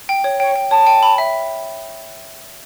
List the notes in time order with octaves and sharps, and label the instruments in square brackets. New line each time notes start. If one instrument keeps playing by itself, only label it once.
[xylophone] G5
C#5
[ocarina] C#5 [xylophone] G5
[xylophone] G5
[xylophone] C#5 [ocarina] A5
[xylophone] G5
B5
E5